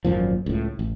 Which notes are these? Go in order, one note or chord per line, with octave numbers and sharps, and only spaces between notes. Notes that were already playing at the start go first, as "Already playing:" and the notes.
G#1 F#2 A#2 F3
C#2 A2
A1